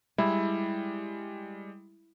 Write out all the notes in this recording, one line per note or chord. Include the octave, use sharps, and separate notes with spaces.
G3 G#3 E4